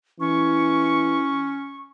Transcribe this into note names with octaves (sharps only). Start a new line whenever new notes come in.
E3 C#4 C#6